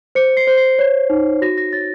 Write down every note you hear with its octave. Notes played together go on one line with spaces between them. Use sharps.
C5 C#7
C7
C5
C7
C#5
D#4
F#4 A#6
A#6
C#5 A6